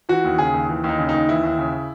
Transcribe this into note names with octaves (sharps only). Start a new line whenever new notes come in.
E3 F#4
D#2
C#3 G#4
D#2
E3
D#2 D#4
C#3
D#4
D#2
E3 E4
D#2
C#3